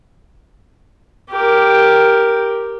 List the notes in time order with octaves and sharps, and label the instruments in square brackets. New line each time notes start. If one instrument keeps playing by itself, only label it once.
[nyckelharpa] G4 A#4